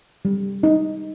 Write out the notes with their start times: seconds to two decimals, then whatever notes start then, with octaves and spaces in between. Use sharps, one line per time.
0.25 G3
0.63 D#4